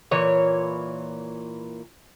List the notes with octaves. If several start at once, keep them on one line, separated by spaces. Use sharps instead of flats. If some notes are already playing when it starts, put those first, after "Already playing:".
A#2 E3 C#5